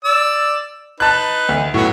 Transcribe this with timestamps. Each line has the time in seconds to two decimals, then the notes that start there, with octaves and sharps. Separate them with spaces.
0.05 D5 E6
1.00 D#4 B4 A5 F#6
1.49 D2
1.74 A2 F#3 B3 F#4